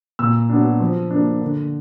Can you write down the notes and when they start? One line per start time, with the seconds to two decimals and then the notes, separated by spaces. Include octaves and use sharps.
0.19 A#2 E6
0.50 F#3 B3 D4
0.80 F3
1.11 A#3 D4
1.42 D3